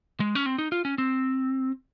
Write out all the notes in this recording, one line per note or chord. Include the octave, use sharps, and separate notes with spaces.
G#3
C#4
C4
D#4
F4
C#4
C4